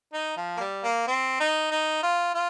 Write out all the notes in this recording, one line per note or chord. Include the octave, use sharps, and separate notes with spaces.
D#4
F3
A#3
G3
A#3
C4
D#4
D#4
F4
F4